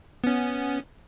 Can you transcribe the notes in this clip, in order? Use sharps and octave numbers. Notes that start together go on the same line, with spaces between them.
B3 C#4